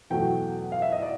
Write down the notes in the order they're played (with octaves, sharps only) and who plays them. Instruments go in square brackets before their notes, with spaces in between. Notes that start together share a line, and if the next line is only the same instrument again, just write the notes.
[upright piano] E2 B2 F#3 A3 G5
F5
E5
D#5
D5